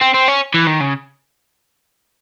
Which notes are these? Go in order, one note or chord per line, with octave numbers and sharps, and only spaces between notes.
C4
C4
C#4
E3
D#3
C#3